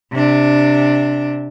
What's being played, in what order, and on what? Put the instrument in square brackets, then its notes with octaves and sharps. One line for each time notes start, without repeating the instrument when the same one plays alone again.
[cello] C3 D4